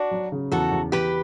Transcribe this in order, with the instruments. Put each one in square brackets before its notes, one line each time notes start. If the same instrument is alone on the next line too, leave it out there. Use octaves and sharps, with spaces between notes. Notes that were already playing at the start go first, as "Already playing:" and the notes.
Already playing: [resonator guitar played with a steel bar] D4 F#4
[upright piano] F#3
C#3
[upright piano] E2 [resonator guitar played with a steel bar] F#4 A4
[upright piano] E2
[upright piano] E2 [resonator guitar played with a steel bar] G4 B4